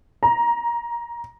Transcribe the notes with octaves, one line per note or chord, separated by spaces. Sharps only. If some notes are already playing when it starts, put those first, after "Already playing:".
A#5